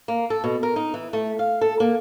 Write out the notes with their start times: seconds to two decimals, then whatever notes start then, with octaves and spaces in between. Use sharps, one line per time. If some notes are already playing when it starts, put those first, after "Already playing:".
0.08 A#3
0.30 A4
0.44 B2
0.63 A#4
0.76 D#4
0.94 E3
1.13 A3
1.39 F5
1.61 A4
1.80 A#3